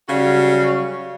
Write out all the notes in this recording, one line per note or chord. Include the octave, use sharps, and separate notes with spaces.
C#3 F#3 G3 F#4 C#5 F5